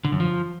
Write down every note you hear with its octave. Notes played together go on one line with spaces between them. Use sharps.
D3
F#2
F3